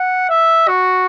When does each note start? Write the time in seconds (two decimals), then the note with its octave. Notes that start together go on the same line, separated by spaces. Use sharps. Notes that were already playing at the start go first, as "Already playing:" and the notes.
Already playing: F#5
0.29 E5
0.68 F#4